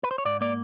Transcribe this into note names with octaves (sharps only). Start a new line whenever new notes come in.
B4
C5
C#5
G#2 D5
A#3 D5